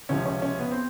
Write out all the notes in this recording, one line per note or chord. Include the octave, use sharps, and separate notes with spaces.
C#2 C3 F3 C#4
C#4
C#4
B3
C4